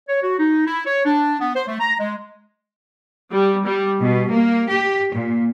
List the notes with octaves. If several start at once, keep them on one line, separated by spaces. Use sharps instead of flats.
C#5
F#4
D#4
E4
C#5
D4
B3
C5
A3
A#5
G#3
G3
G3
B2
A#3
G4
A#2